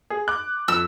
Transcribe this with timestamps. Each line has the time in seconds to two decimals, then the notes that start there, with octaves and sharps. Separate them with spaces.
0.10 G#4
0.28 D6 F#6
0.68 F2 E6